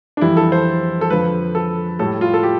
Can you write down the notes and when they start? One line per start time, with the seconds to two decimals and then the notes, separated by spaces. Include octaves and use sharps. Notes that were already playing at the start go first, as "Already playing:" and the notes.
0.17 D4
0.21 F2 E3 G3 E4
0.37 A4
0.52 C5
1.01 A4
1.10 F2 D3 F3 B4
1.55 A4
1.99 A2 G3 A4
2.21 F4
2.34 A4
2.43 G4